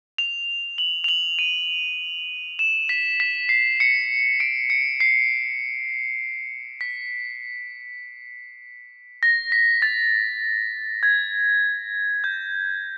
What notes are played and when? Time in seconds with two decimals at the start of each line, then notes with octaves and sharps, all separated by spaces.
0.18 F7
0.78 F#7
1.04 F7
1.08 F#7
1.39 D#7
2.59 E7
2.89 B6
3.20 B6
3.49 C7
3.80 C#7
4.40 D7
4.70 C#7
5.00 C7
6.81 B6
9.23 A#6
9.52 B6
9.82 A6
11.03 G#6
12.24 G6